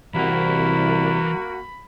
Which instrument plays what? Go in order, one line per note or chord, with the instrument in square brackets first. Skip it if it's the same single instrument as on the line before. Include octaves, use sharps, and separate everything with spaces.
[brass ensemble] C2 [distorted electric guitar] E3 F#5 [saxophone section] A#3 F#4 [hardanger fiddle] B5